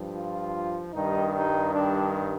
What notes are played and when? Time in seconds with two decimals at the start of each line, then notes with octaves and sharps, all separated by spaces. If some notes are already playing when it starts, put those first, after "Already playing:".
Already playing: G2 F3
0.14 F4
0.93 G2 D#3 G3 D#4
1.34 D#4
1.73 D4